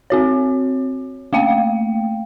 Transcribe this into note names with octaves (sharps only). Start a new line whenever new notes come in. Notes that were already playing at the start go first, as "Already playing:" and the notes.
C4 F#4 C#5
A3 A#3 F5 G5